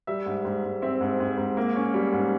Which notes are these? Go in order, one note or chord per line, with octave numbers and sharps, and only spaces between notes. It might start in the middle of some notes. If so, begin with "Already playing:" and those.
G3 E5
G#2
G#2
G#2
C4 E5
G#2
G#2
G#2
A#3
C#4
G3
G#2